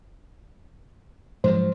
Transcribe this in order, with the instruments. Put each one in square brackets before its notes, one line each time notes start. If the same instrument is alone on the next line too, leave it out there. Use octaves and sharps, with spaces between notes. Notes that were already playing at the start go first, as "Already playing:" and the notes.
[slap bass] G#2 F3 F#3 [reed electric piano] C5